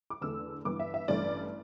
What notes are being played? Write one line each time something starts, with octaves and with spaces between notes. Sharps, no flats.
D6
E2 D3 A3 E6
G2 E3 B3 D6
E5
E5
A1 G2 E3 A3 D5